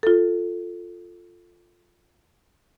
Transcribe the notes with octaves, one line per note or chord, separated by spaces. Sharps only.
F4 A4